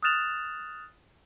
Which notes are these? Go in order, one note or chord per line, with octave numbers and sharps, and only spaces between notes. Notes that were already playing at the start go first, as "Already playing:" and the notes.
D#6 F6 F#6 A6 E7 F7